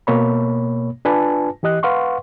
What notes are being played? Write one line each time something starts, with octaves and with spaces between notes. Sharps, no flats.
B2 A#3 C#5 B5
D4 F4 B4 G#5 A5
E3 G4 D#5 F#6
B4 F5 F#5 C6 C#6